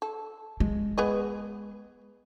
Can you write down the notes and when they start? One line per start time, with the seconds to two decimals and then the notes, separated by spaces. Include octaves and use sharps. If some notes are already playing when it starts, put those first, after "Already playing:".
0.02 A4
0.60 G#3
0.98 B3 G#4 D#5